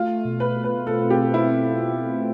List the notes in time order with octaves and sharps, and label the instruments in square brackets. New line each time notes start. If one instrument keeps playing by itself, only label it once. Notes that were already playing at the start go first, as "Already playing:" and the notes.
Already playing: [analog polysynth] A3 [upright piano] F4
[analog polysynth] B2
[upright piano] B4
[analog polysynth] F4
[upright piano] B4
[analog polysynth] C4 [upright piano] A4
[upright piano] G4
[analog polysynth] A3
[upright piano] E4